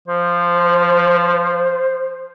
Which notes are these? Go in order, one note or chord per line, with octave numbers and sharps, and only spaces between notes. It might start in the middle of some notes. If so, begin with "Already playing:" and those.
F3 C5